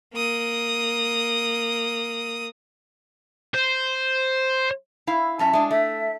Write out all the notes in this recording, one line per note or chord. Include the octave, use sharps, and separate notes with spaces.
A#3 D#6
C5
E4 F5
F#2 C#4 E5 A5
G#3 D4
A3 E5